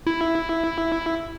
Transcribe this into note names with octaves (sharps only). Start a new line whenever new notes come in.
E4